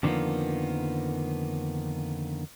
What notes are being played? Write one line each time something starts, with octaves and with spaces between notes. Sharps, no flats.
F2 D3 D#3 F3 A#3 B3